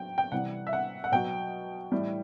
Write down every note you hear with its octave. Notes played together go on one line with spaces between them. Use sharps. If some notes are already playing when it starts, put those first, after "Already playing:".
Already playing: F#3 G5
G5
C3 E3 G3 F#5
E5
F#5
F#5
B2 F#3 G5
A2 E3 G3